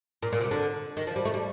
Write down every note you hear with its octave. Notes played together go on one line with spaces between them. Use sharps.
A#2
A#2
C3
D3
D#3
F3
G3
A3
G3